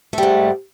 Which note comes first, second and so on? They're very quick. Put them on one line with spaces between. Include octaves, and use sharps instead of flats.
A3 G3 G#2